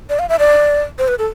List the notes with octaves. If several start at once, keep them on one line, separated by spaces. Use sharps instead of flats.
D5
F5
E5
D5
C5
B4
A4